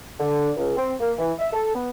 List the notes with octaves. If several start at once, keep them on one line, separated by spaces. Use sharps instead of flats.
D3
C#2
C4
A#3
E3
E5
A4
B3